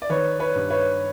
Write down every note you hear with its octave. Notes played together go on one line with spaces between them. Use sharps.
D5
D#3 B4 C#5
B4 C#5
G2
B4 C#5